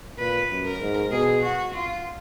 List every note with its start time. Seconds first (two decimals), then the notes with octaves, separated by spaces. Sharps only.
0.19 A#2 B4
0.50 F#2
0.65 A#4
0.81 G#2
1.11 B2 G#4
1.42 F#4
1.74 F4